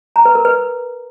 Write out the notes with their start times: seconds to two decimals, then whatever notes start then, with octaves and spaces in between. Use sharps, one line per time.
0.16 A#5
0.25 B4
0.35 A#4
0.45 B4